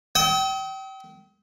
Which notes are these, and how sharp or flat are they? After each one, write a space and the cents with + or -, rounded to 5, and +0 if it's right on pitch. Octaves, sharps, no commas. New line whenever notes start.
G5 -30 D#6 +45